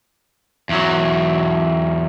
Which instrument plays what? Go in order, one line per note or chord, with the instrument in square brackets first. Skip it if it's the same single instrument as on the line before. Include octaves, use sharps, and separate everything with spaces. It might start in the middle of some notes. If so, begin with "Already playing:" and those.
[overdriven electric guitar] E2 F#3